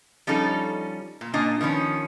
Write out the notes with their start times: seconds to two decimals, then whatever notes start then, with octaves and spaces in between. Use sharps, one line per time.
0.27 F3 G3 C#4 D#4 A4
1.21 A#2
1.34 A#2 A#3 D4 D#5 G#5
1.61 D#3 F3 B3 C#4